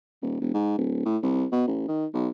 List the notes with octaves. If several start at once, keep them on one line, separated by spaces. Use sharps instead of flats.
D#1
E1
G#2
D1
A2
C2
B2
A1
D#3
B1